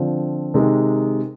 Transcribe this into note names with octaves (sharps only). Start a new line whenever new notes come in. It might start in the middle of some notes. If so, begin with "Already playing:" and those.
Already playing: D3 F3 C4 F4
C3 D#3 G#3 D#4